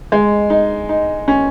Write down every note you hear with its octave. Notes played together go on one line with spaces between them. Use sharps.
G#3
D#4
D#4
C#4